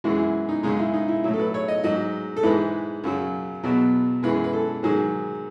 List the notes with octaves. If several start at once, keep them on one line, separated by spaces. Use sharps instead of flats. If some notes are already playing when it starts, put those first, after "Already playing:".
F#2 E3 G#3 F#4
E4
D#4
F#2 C#3 G#3 D#4
E4
D#4
E4
A2 F#3 E4
A4
B4
C#5
D#5
G#2 F#3 D#5
A4
G#2 E3 G#3 B4
F#2 C#3 F#3
E2 B2 F#3
F#2 E3 G#3 B4
B4
A4
G#2 D#3 F#3 G#4